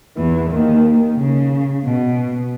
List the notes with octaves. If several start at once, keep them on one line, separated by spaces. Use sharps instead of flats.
E2 E3
D#2 D#3
C#3
B2